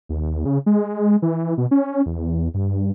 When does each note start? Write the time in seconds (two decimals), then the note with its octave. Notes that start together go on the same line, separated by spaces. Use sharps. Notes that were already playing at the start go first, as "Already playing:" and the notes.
0.09 D#2
0.45 C#3
0.66 G#3
1.22 E3
1.58 B2
1.71 C#4
2.06 E2
2.54 G2